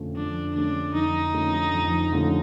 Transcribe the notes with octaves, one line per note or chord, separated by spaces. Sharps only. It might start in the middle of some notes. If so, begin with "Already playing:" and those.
Already playing: F2 D3 F3 A3 C#4
F2 D4
D3 F3 A3 C#4 D4
F2 D#4
D3 F3 A3 C#4
F2
D3 F3 A3 C#4